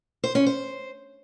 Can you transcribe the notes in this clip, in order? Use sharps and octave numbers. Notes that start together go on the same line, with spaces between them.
C5
C#4
C5